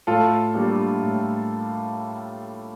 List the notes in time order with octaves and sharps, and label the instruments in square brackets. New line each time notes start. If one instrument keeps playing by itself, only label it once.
[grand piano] A2 F4 A4
G3 A#3 D4
A2